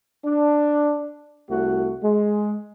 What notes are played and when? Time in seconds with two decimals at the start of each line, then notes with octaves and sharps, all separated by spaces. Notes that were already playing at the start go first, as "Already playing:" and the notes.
0.24 D4
1.49 C2 A3 F#4
2.02 G#3